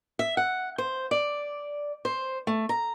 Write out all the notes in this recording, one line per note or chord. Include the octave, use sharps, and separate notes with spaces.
E5
F#5
C5
D5
C5
A3
A#5